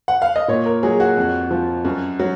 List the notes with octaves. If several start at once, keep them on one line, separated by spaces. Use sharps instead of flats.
F#5
F5
D#5
A#2 C#5
A#4
F#3 G#4
F#4
F2
F3
F#2
F#3